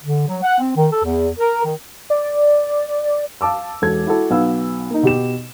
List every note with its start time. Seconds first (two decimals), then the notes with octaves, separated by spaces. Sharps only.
0.03 D3
0.27 F#3
0.42 F#5
0.58 C4
0.77 D#3
0.91 A4
1.04 E2
1.38 A#4
1.64 D#3
2.10 D5
3.41 F5 A5 D6 E6
3.82 E1 A4 G#6
4.07 E4 F#4 A4
4.30 B1 B3 F5 E6
4.91 A#3 D#4
5.03 B2 G4 E7